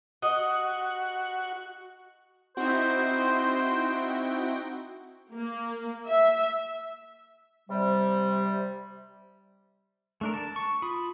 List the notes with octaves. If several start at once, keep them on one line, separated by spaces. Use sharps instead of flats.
F#4 D#5
C4 D#4 E4 F#4 C5 G5
A#3
E5
C3 G3
A3 D4 A#4
A5
C#6
F4 B5 D#6